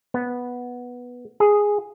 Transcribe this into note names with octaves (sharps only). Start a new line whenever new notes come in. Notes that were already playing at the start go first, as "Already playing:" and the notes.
B3
G#4